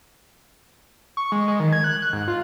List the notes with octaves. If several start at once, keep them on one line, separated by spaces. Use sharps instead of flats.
C#6
G#3
G#3
D#3
G#6
F#6
F#6
G#2
F4